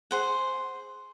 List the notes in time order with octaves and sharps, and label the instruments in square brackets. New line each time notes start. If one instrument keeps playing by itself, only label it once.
[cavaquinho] G#4 C5 F#5